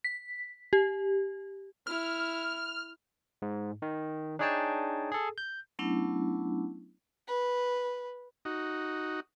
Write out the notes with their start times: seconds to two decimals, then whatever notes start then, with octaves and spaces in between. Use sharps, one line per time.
0.04 B6
0.73 G4
1.87 E4 F6
3.42 G#2
3.82 D#3
4.39 D4 D#4 G#4 C#5 G5 A5
5.12 G#4 A4
5.38 G6
5.79 F#3 A3 B3 C#4 D4 E4
7.28 B4
8.45 D#4 F#4